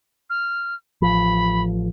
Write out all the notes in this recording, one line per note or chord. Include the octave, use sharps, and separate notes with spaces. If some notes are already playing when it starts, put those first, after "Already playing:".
F6
A1 F3 B5